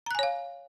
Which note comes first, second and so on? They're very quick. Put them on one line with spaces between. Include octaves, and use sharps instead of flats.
A#5 F#6 G#5 C#5 F5